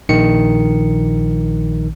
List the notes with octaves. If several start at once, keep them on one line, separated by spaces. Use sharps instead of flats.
A#1 D#3 C#7